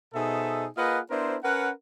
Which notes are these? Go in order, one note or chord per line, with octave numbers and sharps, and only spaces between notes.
B2 D#4 G#4 A4 C5 E5
A#3 F4 G#4 B4 D#5 F#5
B3 D4 E4 A#4 C5
C#4 A#4 B4 F#5